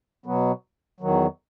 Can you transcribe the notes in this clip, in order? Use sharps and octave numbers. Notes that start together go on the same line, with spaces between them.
B2 F#3 B3
E2 D#3 F#3